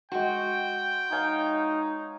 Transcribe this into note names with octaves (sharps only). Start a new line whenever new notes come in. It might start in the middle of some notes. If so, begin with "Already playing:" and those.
G#3 F#4 G5 C#6
D#4 C#5 F5 G#5